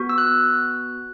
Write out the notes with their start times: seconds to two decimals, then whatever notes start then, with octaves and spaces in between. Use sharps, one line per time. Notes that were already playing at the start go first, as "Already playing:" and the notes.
Already playing: B3 F#4
0.09 E6
0.18 F#6